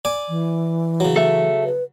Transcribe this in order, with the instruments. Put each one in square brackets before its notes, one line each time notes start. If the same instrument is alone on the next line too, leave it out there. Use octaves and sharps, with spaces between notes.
[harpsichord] D5 G#5
[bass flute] E3
[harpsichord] C#3 F#3
[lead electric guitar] A4 E5
[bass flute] B4